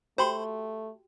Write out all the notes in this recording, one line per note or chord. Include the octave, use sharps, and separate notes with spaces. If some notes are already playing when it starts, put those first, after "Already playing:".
A3 F#4 G4 C5 G5 B5 C6